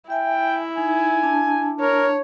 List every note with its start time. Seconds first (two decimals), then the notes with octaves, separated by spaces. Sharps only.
0.10 E4 E5 G5 G#5
0.78 D#4 G#5
1.23 D4 A5
1.80 A#4 C#5